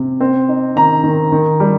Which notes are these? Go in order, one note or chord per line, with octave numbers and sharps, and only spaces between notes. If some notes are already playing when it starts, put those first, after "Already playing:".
Already playing: C3
C4
D#4
D#3 A#5
D#3
D#3
G3